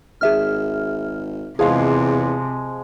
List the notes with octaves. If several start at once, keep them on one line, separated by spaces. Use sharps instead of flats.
G#1 G#4 E5 F6
E2 C3 F3 G#3 G#4 F5